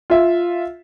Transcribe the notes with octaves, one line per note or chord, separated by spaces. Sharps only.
F4 E5